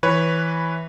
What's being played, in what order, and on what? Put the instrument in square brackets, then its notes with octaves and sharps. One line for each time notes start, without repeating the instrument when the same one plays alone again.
[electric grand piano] E3 B4 C#5